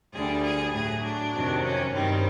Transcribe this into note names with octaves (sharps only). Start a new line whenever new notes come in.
D2 D3 G3 G#4
G#4
A2 F#3 G#4
D4
F2 C3 D#3 F#3
C#4
G2 D#3 G3 C4